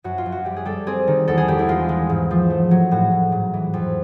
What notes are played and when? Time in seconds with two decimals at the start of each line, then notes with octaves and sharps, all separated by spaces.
0.04 F#2 F#4
0.18 F4
0.26 F#2
0.32 F#4
0.45 G3 G4
0.56 G#4
0.65 G3 A4
0.87 C4 G#4
1.07 D#3
1.28 E2 A4
1.38 G#4
1.48 E2 G4
1.59 E4
1.69 G#3 F4
1.89 G#3
2.09 G#2
2.31 F3
2.50 A3
2.71 F#3
2.91 A2 F#4
3.12 A2
3.32 G#2
3.54 E3
3.74 F2